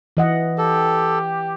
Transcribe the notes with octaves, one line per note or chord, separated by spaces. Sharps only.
E3 D#5 F#5
G4 A4